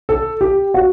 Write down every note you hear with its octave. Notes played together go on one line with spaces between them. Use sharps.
A4
G4
F#4